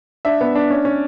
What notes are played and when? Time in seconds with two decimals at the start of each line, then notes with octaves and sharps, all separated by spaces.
0.25 D4 E5
0.41 B3
0.55 D4
0.70 C#4
0.85 C#4